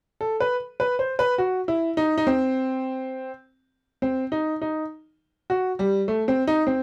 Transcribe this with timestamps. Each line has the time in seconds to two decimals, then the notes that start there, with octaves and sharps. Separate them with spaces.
0.21 A4
0.40 B4
0.80 B4
0.99 C5
1.19 B4
1.38 F#4
1.68 E4
1.97 D#4
2.18 D#4
2.27 C4
4.02 C4
4.32 D#4
4.62 D#4
5.50 F#4
5.79 G3
6.08 A3
6.28 C4
6.47 D#4
6.67 C4